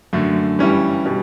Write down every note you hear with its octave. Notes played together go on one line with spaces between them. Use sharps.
F#2 D3 A3
G2 E3 G3 C#4 E4
B2 G3